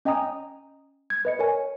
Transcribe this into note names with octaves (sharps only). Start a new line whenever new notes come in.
C#4 D#5 G5 G#5 A#5 D#6
G#6
B4 D#5 C#7
A#4 C#5 G#5